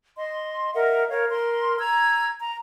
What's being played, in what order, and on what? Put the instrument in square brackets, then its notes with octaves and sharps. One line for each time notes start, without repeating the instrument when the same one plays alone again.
[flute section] D#5 C6
A#4 D#5 E5 F#5
A#4 C#5 F5
A#4 C6
A#5 E6 G#6
A#5